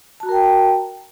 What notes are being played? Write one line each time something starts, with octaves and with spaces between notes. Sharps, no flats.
F#4 A#4 G5 A5 A#5